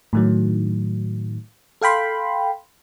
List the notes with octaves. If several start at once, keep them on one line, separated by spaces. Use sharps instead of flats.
A2 D#3 F#3
A4 F5 G5 B5 C6